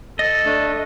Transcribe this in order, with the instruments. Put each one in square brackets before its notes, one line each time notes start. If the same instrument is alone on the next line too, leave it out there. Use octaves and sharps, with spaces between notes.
[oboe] A4 [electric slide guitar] D#5
[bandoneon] A3 D4